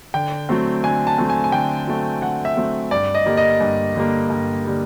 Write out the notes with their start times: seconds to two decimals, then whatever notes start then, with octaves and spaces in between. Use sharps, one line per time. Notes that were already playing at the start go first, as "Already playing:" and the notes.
0.14 D3 G5
0.49 F#3 A3 C4
0.84 D3 G#5
1.07 A5
1.18 F#3 A3 C4
1.30 G#5
1.44 G#5
1.52 D3 G5
1.88 F#3 A3 C4
2.22 D3 F#5
2.45 E5
2.57 F#3 A3 C4
2.91 G2 D5
3.15 D#5
3.26 D3 G3 A#3
3.37 D#5
3.61 G2
3.96 D3 G3 A#3
4.30 G2
4.65 D3 G3 A#3